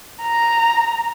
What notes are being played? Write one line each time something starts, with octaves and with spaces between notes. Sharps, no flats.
A#5